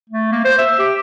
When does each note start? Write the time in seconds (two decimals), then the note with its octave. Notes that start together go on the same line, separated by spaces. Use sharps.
0.09 A3
0.32 A#3
0.45 C5
0.58 E5
0.79 G4